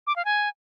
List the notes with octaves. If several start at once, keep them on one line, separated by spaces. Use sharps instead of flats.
D6
F5
G#5